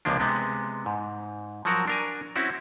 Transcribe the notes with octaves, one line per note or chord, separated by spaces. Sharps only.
C#2 C3 F3 A#3 D4
C3 G#3 B3 C4
G#2
F3 F#3 F#4 A#4
D4 A#4 G#5
C4 C#4 E4 F#4